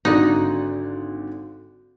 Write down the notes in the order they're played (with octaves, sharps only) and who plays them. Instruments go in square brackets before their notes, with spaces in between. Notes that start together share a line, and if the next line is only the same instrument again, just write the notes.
[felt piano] G#1 D3 D5 [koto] D#4 [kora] F#4